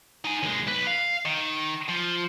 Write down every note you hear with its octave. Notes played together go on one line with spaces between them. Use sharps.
D#4 G#5
D#2 G#3
B1 B4
F5
D#3
F3